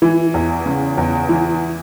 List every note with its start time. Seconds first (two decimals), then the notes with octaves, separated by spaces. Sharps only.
0.02 E3
0.34 E2
0.66 C#3
0.98 E2
1.29 E3